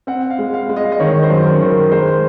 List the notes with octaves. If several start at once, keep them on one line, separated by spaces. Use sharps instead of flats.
C4 F#5
F5
G#3
F5
G#3
D#5
F5
D#5
D#3 C#5
C5
F#2
A#4
D#3
A#4
G#3 C5